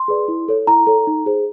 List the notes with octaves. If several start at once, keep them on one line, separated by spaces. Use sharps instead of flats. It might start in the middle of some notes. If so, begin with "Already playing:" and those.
Already playing: C6
G#4 B4 D5
E4
A4 C#5
E4 A#5
A4 C#5
D#4
G#4 C5